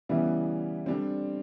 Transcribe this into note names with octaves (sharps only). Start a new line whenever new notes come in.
C#3 E3 G3 B3 E4
D3 G3 C4